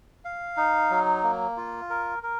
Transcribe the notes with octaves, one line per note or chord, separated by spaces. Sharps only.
F5
D#4
F#3
A#3
F4
A#4
A#4